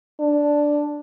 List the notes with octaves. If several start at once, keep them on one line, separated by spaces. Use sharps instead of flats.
D4